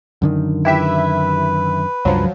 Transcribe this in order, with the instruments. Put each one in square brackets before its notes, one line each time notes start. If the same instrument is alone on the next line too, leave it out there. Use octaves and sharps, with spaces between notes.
[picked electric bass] F#2 D3 D#3
[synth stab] E4 G4 E5 [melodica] B4
[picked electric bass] C#2 G2 [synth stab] F3 F#3